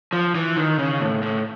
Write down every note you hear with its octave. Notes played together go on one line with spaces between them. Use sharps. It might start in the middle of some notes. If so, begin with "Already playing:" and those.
F3
E3
D#3
C#3
A2
A2